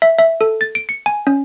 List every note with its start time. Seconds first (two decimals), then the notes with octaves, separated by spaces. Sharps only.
0.02 E5
0.19 E5
0.41 A4
0.61 A6
0.75 D7
0.89 C#7
1.06 G#5
1.27 C#4